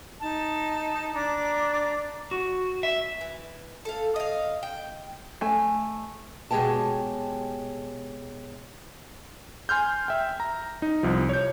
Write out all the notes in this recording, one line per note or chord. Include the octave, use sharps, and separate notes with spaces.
D#4 A5
D4 A#5 D6
F#4
E5
E3
A4 F5
D#5 F5
G5
A3 G#5
B2 G#3 G4 C#5 G5 A5
G#5 C6 F6 G6
E5 G5
A#5
D#4
C2 F3
C#5 G6